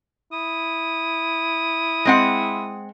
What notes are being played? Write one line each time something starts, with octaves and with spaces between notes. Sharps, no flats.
E4 D#6
G#3 C4 F#5